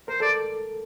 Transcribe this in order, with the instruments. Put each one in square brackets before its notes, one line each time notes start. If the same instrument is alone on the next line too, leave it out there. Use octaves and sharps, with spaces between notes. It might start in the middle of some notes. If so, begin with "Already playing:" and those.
[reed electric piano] A#4 [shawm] C5
[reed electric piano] A4 [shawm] D5